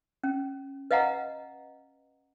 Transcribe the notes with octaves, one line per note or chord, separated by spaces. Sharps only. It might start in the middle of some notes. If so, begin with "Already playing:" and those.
C#4
B4 D#5 F5 F#5 A#5